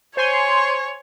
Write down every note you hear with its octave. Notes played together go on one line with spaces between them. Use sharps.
C5 C#5 G#5 C6